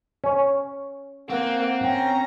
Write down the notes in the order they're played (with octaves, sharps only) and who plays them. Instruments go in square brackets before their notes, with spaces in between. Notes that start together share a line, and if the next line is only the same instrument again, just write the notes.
[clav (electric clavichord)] C#4 C#5
[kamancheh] A#3 [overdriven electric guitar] C4 [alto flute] F#5
[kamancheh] C#4 A#5 [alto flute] G5